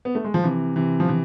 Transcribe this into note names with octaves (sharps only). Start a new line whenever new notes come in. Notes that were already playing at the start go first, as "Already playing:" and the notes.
B3
A3
G#3
F3
C3 E3
C3 E3
F3
C3 E3